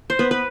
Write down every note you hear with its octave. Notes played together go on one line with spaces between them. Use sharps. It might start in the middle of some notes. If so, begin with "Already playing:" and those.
C5
B3 B4
B4